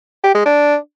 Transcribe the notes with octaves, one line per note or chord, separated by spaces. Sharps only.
G4
G#3
D4